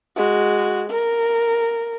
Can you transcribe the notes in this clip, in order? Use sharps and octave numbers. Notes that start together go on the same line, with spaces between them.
G#3 F#4
A#4